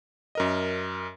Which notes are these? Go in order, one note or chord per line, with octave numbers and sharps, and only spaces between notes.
F#2 A#4 D#5